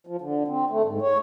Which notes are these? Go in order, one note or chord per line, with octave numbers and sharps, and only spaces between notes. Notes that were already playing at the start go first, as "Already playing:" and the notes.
F3
D3
C4
A3
G#2
C#5